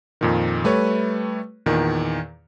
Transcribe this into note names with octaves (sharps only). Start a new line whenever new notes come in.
F2 A#2 D#3
G3 A3 B4 C#5
E2 A#2 D#3